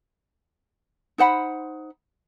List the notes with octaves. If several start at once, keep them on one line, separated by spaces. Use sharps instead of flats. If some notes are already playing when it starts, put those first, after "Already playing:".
D#4 C5 F#5 B5